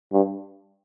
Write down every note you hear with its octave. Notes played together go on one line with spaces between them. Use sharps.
G2